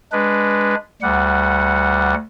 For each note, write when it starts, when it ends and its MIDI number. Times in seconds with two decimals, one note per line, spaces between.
0.12 0.75 56
0.12 0.75 62
0.12 0.75 71
1.02 2.14 38
1.02 2.14 55
1.02 2.14 78